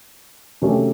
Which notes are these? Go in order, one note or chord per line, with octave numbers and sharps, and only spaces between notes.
C3 D#3 F#3 A3 C#4